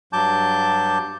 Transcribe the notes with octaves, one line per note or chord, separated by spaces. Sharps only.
G2 F#3 A5 D6 G6